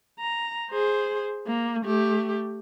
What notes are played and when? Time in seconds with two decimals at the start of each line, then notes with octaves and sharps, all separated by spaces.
0.20 A#5
0.71 G#4 C5
1.47 A#3
1.85 A3 G4